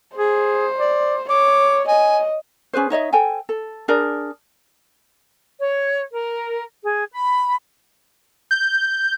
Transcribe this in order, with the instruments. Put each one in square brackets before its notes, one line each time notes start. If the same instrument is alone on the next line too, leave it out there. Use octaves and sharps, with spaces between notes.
[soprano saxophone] G#4 [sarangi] C5
[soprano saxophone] D5
[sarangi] C#5 [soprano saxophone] D6
[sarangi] D#5 [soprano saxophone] G#5
[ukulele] C#4 G#4 B4 C5
D#4 C#5 D#5 E5
A4 C5 G5 G#5
A4
D4 G#4 A#4 D5
[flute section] C#5
A#4
G#4
B5
[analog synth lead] G6